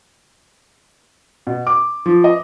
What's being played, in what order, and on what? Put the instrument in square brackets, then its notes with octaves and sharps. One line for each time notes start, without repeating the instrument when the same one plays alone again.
[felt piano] B2
D6
F3
D#5